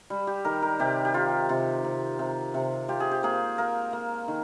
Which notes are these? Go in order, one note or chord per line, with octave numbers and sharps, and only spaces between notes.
G3
G4
D#3 A#4
A#4
C3 G4
G4
D#3 F4
C3 F4
C3
C3
C3
F4 G4
G#4
G4
A#3 G#4
A#3 A#4
A#3
D#3